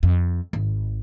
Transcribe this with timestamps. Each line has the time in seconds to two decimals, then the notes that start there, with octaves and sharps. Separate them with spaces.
0.03 F2
0.53 G#1